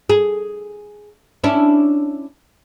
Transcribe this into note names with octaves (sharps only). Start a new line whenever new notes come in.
G#4
C#4 D4 E4